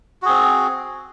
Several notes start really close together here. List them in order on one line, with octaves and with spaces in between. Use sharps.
F#4 G#4 C4